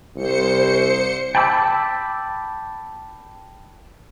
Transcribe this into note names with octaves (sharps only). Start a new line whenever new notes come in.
C2 C5 C#7
G5 A5 B5 D6 E6